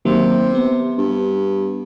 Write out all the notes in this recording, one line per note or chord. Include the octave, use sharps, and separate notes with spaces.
C3 D#3 F#3 A#3
B3
G2